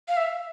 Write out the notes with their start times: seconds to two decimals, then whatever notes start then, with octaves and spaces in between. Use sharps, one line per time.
0.08 F5
0.17 E5